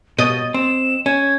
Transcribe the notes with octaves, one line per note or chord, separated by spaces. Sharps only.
B2 D#5 A6
C4 E7
C#4 G#6